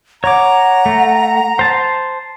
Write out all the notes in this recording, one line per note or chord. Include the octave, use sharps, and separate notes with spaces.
C#5 F#5 A#5 D6
A3
C5 A5